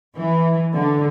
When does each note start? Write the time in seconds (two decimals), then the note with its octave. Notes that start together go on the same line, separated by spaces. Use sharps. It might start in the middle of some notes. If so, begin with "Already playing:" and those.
0.15 E3
0.74 D3